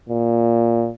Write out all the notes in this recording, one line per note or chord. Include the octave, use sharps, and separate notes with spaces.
A#2